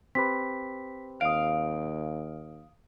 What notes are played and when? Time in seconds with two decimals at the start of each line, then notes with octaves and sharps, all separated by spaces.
0.15 C4 G4 B4 B6
1.21 D#2 F5 D#6 D7